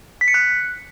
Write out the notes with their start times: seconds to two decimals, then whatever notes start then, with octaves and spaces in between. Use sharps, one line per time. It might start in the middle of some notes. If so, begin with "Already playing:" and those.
0.21 B6
0.28 C#7
0.34 F#6